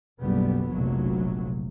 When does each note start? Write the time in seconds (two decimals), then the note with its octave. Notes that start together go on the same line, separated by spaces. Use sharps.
0.21 F#1 B1 D3 G3 B3
0.69 F1 A#1 F#3